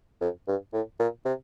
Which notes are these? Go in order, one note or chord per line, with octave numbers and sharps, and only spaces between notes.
F2
G2
A2
A#2
C3